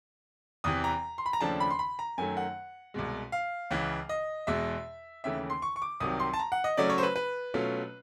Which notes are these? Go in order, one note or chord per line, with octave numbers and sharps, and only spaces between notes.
E2 C3 E3 D#6
A#5
C6
B5
A#5
D#2 C#3 F3 A3 D4 A5
B5
C6
B5
A#5
F#2 D#3 F#3 A3 G#5
F#5
C2 B2 G#3
F5
C#2 C#3 E3
D#5
E2 B2 G#3 E5
D#2 C#3 E3 A3 E5
C6
C#6
C#6
D6
C2 C3 D#3 F#3 D#6
C6
A5
A#5
F#5
D#5
C#3 F#3 A3 C#4 D5
C#5
C5
B4
B4
B2 F#3 A3 C#4 F4